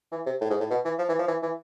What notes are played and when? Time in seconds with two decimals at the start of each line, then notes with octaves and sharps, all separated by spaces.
0.12 E3
0.26 C3
0.41 A2
0.50 G#2
0.60 A2
0.70 B2
0.85 E3
0.98 F3
1.09 E3
1.19 F3
1.28 E3
1.43 E3